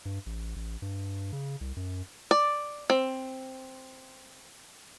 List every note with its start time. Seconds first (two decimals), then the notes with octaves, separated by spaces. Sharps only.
0.05 G2
0.26 A1
0.56 A1
0.82 G2
1.32 C#3
1.61 C2
1.77 F#2
2.31 D5
2.90 C4